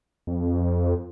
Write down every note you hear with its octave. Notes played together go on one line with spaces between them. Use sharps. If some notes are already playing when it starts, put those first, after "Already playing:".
F2